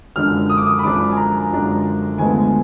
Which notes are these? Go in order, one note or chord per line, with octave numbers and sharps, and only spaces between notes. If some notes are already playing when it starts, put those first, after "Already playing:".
F#2 D3 F3 G#3 D4 F6
D#6
D6
D#6
B5
F#2 D3 F3 G#3 D4 D6
G#5
A#5
F#2 D3 F3 G#3 D4
D2 D3 F3 G#3 B3 G#5